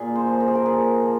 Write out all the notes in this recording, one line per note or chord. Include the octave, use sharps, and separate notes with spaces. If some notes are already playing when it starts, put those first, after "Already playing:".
Already playing: A#2 G#4
C5
F3
A#4
G#4
A#4
A#2 G#4
F3